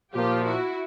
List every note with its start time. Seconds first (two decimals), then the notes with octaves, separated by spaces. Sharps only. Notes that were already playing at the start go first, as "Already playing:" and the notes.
0.14 A#2 F3 A#3 F4 G4
0.44 E4 F#4